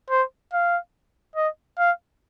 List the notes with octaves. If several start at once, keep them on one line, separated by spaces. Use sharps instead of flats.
C5
F5
D#5
F5